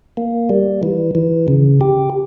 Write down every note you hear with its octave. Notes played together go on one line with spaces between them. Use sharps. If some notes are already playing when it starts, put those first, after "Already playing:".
A#3
G3
E3
E3
C#3
G4